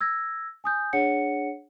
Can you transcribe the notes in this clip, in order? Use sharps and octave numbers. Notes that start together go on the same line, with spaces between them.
E6 G#6 A#6
G#5 D#6 G6
D4 G#4 C#5 F#5 C#7